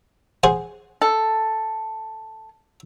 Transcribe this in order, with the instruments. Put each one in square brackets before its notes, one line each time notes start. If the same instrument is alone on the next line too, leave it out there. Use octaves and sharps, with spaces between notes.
[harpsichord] G#4 C5 F#5
[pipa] A4